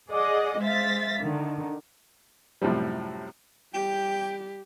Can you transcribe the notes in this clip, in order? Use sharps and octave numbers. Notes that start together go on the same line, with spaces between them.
G#4 D5 D#5 F#5
G#3 C5 E5 F5 A6 B6
D3 D#3
F#2 A2 C3 F3 G3
G3 G4 G5